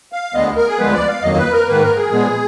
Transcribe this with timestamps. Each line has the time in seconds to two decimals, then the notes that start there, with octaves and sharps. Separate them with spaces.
0.12 F5
0.34 D2 D3 G#3 B3 D#5
0.56 A#4
0.67 G#4
0.78 D2 D3 F3 G#3 B3 B4
0.93 D5
1.08 F5
1.22 F2 D#3 F#3 A#3 D#5
1.37 B4
1.52 A#4
1.67 G#2 D#3 A#3 B4
1.82 A#4
1.96 G#4
2.11 A#2 F3 G#3 B3